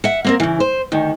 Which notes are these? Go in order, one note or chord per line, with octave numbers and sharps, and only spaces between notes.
E5 F#5
A#3 C4 A#4
C#3 E3
C5
D2 D#3